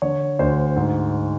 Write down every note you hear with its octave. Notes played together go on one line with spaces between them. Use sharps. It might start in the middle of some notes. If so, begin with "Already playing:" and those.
D3 C#5
D2 C5
G#2